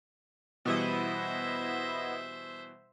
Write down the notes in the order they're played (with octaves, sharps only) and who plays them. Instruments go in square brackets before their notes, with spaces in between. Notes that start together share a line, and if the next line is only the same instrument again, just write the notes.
[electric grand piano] B2 E3 G3 [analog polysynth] B3 E4 D#5 [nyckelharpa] C5 E5